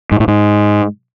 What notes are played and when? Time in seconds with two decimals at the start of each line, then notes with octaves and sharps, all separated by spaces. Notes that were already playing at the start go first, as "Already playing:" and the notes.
0.12 G#2
0.20 A2
0.28 G#2